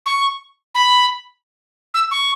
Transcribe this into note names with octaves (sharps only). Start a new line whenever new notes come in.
C#6
B5
E6
C#6